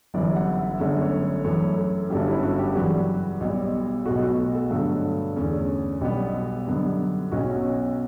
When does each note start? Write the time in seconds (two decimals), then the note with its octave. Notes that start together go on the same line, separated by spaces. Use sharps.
0.14 G1 F#2 E3 G3 D5
0.36 F#5
0.58 E5
0.80 G1 F#2 D3 A3 C#4
1.01 C#5
1.23 C#5
1.44 F#2 E3 A3 C#5
1.78 A4
2.10 G1 G2 F#3 C#4 G4
2.26 E4
2.43 F#4
2.59 G4
2.75 F#2 C#3 E3 G3 F#4
3.40 B1 B2 G3
4.06 B1 B2 A3 F#4
4.22 F#4
4.54 A4
4.71 G2 D3 F#3 A3
5.36 E2 D3 A3 C#4
6.01 B1 B2 G3 B3 G4
6.67 F#2 D3 G3 B3
7.32 B1 B2 F#3 C#4 F#4